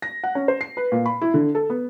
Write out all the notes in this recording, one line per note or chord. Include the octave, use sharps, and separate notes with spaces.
A#6
F#5
C#4
C5
C7
B4
A#2
B5
E4
D3
A4
B3